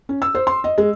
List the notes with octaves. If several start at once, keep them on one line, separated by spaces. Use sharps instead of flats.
C#4
E6
C5
C6
D#5
G#3